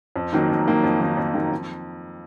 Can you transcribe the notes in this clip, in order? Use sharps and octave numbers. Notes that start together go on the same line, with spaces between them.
F2
D#3 F#3 A#3 D#4
F2
D#3 F#3 A#3 D#4
F2
D#3 F#3 A#3 D#4
F2
D#3 F#3 A#3 D#4
F2